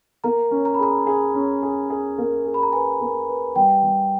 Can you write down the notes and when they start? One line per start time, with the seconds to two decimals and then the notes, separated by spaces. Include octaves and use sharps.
0.24 A#3 A#5
0.51 C#4
0.65 A#5
0.74 B5
0.79 G#4 A#5
1.06 G#4
1.34 C#4
1.63 G#4
1.90 G#4
2.18 A#3
2.45 G#4
2.54 B5
2.63 A#5
2.73 B4 G#5
3.01 A#3
3.28 B4
3.56 G3 G5
3.83 G3